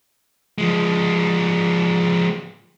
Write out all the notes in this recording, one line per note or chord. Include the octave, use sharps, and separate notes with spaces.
F3 G#3